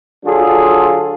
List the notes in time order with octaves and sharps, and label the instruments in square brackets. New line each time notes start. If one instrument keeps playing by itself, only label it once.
[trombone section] D3 F#3 D4 F4 G#4 A4